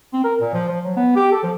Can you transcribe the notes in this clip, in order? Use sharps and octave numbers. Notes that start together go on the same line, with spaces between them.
C4
A#4
A#2
F3
F3
F#3
B3
G4
A4
F3